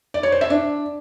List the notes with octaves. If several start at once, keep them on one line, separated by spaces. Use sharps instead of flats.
D5
C#5
C5
E5
D4